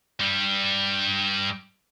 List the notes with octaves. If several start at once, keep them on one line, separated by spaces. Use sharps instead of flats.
G2 G3